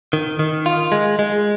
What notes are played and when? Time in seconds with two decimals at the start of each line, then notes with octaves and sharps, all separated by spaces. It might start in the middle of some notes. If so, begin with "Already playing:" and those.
0.13 D#3
0.39 D#3
0.66 F4
0.92 G#3
1.19 G#3